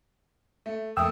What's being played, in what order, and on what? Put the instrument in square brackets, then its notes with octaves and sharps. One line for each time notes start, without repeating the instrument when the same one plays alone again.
[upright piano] A3
[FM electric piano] F2 G5 E6 [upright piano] A3 A#3 [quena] D#6